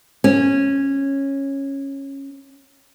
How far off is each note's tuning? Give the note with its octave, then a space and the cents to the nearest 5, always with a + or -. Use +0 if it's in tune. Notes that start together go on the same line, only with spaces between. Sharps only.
C#4 -10